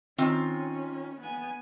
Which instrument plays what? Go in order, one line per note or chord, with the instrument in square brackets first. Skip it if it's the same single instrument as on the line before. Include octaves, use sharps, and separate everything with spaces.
[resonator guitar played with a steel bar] D#3 C4 F4 [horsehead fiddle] C#4
[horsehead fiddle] B3 G#5